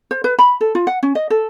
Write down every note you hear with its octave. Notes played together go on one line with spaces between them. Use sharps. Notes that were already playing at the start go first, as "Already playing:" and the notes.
C5
B4
B5
A4
F4
F#5
C#4
D#5
A4